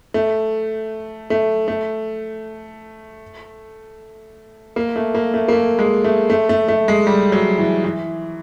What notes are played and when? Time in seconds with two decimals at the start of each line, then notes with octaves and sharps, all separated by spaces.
0.14 A3
1.30 A3
1.68 A3
4.76 A#3
4.96 A3
5.15 A#3
5.34 A3
5.48 A#3
5.52 A3
5.79 G#3
6.04 A3
6.30 A3
6.49 A3
6.68 A3
6.88 G#3
7.07 G3
7.32 F#3
7.58 E3
7.84 E3